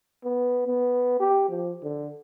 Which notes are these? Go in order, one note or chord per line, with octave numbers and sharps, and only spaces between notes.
B3
B3
G4
F3
D3